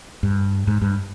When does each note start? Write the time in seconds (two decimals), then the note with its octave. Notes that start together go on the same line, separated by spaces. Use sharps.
0.23 G2
0.67 G#2
0.82 G2